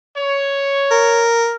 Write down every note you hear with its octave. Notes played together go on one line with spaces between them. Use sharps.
C#5
A#4